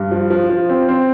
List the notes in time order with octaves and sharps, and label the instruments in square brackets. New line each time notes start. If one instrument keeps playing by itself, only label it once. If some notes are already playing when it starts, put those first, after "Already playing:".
Already playing: [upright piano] G2
F3
F3
F3
C4
C4